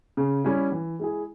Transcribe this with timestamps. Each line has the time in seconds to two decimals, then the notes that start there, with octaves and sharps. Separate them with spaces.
0.17 C#3
0.44 G3 C#4 E4
0.72 E3
0.99 G#3 E4 G#4